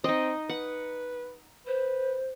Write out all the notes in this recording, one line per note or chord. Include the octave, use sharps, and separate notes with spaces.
C4 D#4 D#5
B4 F#5
B4 C5